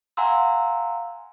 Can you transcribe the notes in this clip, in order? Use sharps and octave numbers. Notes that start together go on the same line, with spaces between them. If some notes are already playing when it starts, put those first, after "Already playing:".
F5 F#5 G#5 A#5 C6 E6